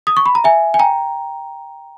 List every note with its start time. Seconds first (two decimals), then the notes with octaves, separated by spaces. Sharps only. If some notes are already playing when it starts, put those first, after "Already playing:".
0.07 D#6
0.17 C#6
0.26 B5
0.35 A#5
0.44 E5 G#5
0.74 G#5
0.79 G5 A#5